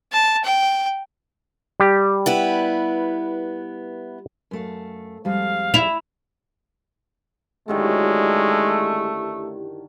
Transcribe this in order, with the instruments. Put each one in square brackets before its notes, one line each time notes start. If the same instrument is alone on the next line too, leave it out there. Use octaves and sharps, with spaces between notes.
[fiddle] A5
G5
[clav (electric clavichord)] G3 G4
[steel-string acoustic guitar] B3 E4 B4
F#2 A3 F5
[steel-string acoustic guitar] F2 G3 G#3 [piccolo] F5
[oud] E4 [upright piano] F7
[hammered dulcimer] F#2 D3 D#3 [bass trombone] G#3 [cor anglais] A3 [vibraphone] E4 G4